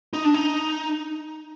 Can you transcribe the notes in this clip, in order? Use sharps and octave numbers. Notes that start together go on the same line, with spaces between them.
D#4
D4
D#4